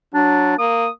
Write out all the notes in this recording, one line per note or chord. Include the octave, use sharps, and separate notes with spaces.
F#3 D4
A#3 D#6